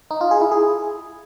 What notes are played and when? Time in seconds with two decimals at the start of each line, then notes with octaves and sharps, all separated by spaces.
0.11 D#4
0.21 F4
0.31 G#4
0.41 E4
0.51 G#4